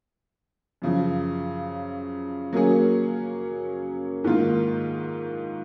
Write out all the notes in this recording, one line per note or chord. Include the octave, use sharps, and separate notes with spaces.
F#2 C#3 F3
F#3 A#3 C#4 G#4
G#2 D#3 A#3 F4